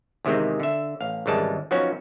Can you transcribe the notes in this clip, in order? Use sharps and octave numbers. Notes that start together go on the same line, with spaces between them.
E2 C3 D#3 G#3 C4
D3 E5
A1 F5
G#1 C#3 E3 G3 G#3 A5
F3 F#3 B3 C#4 D#4 F#4